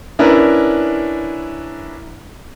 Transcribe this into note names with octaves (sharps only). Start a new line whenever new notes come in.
C#4 D4 E4 A#4 B4